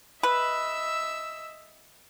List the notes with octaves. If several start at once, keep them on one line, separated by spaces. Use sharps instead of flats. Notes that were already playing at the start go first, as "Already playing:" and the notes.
B4 D#5 E5 E6